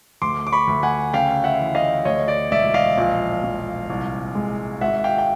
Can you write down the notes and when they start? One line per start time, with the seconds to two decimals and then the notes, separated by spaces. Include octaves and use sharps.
0.22 D2 C6 D6
0.47 D6
0.52 B5 C#6
0.67 D2
0.83 F#5 G#5
1.13 C#3 F5 G5
1.44 E5 F#5
1.60 E3
1.75 D#5 F5
2.05 D2 C#5 D#5
2.28 D5
2.51 E1 D5 E5
2.74 D#5 F5
2.98 A#1
3.44 A#1
3.90 C2
4.35 G#3
4.81 G#1 E5 F#5
5.04 F5 G5
5.18 G5